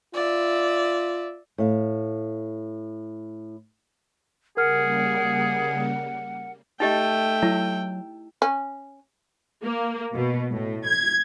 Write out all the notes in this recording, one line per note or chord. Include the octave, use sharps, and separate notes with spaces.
F4 D5 E5
A2 F5
C#3 G3 A#3 G#4 A#4 F#5 F6
A3 D#4 G4 D#5 G5
F#3 E4
C#4
A#3
B2
A2
G#6